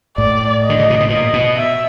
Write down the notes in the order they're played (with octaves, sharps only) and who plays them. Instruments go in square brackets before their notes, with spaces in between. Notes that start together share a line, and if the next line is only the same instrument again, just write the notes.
[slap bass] A2 [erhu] D5
[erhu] D#5
[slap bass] D3
C#3
C3
B2
[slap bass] A#2 [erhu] D#5
[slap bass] B2
[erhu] E5